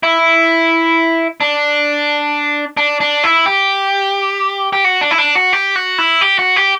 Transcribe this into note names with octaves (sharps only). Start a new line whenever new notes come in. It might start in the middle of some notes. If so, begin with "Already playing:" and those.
E4
D4
D4
D4
E4
G4
G4
F#4
D4
E4
D4
F#4
G4
F#4
E4
G4
F#4
G4